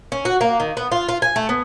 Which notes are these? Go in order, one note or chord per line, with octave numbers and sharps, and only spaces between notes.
C#4
F#4
A#3
D#3
B3
F4
F4
G#5
A3
B3